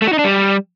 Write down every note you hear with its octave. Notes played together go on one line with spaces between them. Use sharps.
A3
F#4
D#4
D4
G3